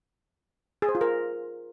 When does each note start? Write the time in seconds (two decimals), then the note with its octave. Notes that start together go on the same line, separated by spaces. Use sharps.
0.82 G#4
0.89 C5
0.95 F4
1.01 A#4